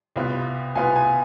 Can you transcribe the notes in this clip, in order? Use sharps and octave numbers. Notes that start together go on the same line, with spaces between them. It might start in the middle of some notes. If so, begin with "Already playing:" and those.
C2 B2 B3 F4 B4
C2 B2 B3 F4 B4 G#5
G#5